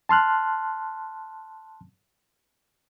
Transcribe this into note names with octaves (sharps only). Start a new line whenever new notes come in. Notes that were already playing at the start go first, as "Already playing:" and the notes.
A5 C6 F6 F#6